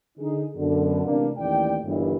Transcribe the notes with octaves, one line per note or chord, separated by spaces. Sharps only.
D3 D#4 G#4
F#2 B2 D3
A1 C3 A#3 D4
A1 D#2 E3 D5 G5
G1 G2 A#2 C#3 E3 G4